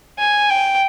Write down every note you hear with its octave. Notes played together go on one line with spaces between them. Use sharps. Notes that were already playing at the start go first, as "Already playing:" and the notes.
G#5
G5